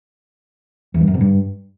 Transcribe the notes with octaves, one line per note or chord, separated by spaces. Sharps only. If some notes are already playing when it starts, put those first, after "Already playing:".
E2
G2
F#2
C3
G2